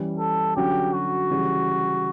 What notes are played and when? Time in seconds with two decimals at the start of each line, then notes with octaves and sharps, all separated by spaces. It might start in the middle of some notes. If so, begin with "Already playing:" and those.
Already playing: E3 G3 C#4
0.19 A4
0.56 D3 F#3 C#4 F#4 G4
0.93 F#4
1.30 C#3 E3 G3 C#4 G4